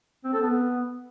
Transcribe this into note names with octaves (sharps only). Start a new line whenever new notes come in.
C4
A4
B3